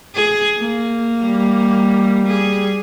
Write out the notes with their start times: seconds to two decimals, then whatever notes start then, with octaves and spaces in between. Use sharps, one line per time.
0.15 G#4
0.58 A#3
1.24 G3
2.27 G#4